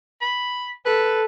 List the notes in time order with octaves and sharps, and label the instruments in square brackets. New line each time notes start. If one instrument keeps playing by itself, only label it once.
[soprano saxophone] B5
[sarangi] A4 [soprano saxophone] B4